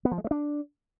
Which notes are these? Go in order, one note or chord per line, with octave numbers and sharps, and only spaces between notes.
B3
F3
G#3
A3
D4